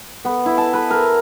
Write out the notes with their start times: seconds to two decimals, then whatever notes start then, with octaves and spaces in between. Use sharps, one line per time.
0.25 B3
0.46 E4
0.58 A5
0.73 B4
0.90 A#4